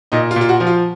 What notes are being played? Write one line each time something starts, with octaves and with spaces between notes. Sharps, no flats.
A#2 D#4
F4
A#2
F4
F#4
F3
F4